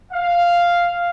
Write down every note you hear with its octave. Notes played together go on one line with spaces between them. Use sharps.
F5